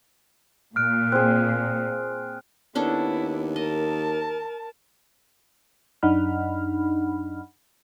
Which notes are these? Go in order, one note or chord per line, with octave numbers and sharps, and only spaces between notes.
A#2 F6 F#6 D7
C4 G#4 F#6
D#2 B3 C#4 D4 E4 A4
A#4 D#5 A5
F#2 D4 D#4 F#5 B5 F6